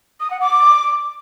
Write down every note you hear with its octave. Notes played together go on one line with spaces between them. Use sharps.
D#6
F#5
D6